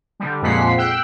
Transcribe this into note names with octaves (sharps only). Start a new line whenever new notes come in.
D3 G3
F2 A#2 G#3 F#5 B6 C7
G5 E6 F#6